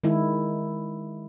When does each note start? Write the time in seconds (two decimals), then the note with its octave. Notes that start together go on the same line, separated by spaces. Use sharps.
0.04 D#3 G#3 E4